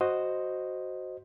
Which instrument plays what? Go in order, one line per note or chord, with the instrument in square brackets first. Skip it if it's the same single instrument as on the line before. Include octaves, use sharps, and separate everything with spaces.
[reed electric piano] F#4 C5 D#5